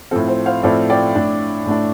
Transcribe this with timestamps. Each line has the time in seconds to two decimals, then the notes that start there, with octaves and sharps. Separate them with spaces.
0.11 A2 F3 C4 A4
0.28 C5
0.46 C5 F5
0.63 A2 F3 C4 A4 D5
0.90 D5 G5
1.15 A2 A3 D4
1.66 A2 A3 D4